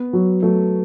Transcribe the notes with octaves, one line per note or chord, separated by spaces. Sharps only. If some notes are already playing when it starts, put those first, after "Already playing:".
Already playing: B3
F#3
F#3 A3